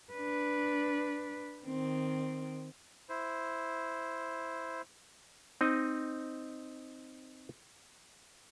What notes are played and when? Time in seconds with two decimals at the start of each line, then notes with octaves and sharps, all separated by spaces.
0.13 D4 B4
1.66 D#3 C4
3.09 E4 C5
5.61 C4 D#4 D#5